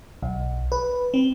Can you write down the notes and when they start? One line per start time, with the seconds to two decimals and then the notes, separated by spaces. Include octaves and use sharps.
0.22 B1
0.72 B4
1.14 C4